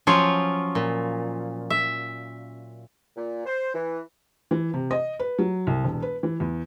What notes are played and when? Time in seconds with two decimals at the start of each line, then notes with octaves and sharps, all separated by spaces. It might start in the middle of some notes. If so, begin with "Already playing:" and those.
0.07 F3 F#3 C#4 F4 C#5
0.75 A#2
1.70 E5
3.16 A#2
3.45 C5
3.74 E3
4.51 E3
4.74 C3
4.91 D#5
5.19 B4
5.39 F#3
5.67 C2
5.84 E1
6.02 B4
6.23 E3
6.40 E2